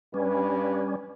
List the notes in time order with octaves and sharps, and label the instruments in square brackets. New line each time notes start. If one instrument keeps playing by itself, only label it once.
[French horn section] G2 B4 [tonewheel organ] G3 C#4